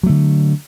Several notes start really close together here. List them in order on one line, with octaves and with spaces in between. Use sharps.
F#3 A3 D3